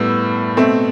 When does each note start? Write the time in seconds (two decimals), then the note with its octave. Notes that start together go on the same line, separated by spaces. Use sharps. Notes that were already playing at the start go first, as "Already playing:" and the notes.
Already playing: A2 G3 B3 E6
0.57 B2 A3 C4